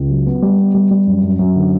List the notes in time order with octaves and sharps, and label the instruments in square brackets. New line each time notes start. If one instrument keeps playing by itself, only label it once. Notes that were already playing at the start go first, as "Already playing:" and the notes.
Already playing: [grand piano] C#2
F#3
B3
G3
B3
G3
G3
F#2
F#2
F#2
D3